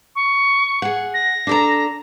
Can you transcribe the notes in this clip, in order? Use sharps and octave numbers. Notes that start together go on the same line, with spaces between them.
C#6
G#4 F#5
A#6
D4 A4 A#5